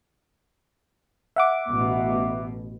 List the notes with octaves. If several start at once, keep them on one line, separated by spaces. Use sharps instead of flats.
E5 F#5 D6
A1 B2